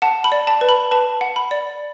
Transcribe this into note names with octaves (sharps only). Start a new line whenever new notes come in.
F#5 A5
B5
D5
A5
B4
B5
B4 A5
F#5
B5
D5